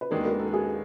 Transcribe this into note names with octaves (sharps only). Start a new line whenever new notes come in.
B4
D#2 D#3 G#3 B3 D4 A#4
A#4
A4
G#4